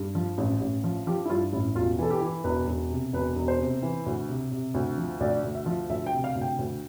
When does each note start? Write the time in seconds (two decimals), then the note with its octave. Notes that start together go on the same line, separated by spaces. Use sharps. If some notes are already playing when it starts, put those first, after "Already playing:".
Already playing: G2
0.15 F3
0.38 A1
0.61 A1
0.84 F3
1.07 F3 G4
1.25 E4
1.29 G2 F4
1.53 A1 E4
1.75 E1 F4
1.98 E3 A4
2.10 G4
2.22 E3
2.44 E1 B4
2.67 E1
2.90 C3
3.13 E1 B4
3.36 E1
3.48 C5
3.60 C3
3.83 E3
4.06 D2
4.28 C3
4.52 C3
4.74 D2
4.98 F3
5.20 D2 D5
5.44 D2
5.55 E5
5.66 F3
5.90 D2 E5
6.06 G5
6.13 C3
6.24 F5
6.35 D2
6.41 G5
6.59 D2